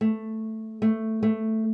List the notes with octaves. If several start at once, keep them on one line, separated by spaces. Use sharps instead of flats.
A3
A3
A3